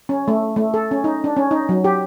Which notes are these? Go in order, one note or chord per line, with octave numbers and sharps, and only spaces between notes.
C#4
A3
A3
A4
C#4
D#4
D4
C#4
D#4
F#3
G4